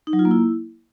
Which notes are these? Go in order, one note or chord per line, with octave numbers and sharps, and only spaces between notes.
D#4
F#3
F4
A#3
E4